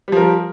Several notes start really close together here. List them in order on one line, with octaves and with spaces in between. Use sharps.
G3 F3 A#4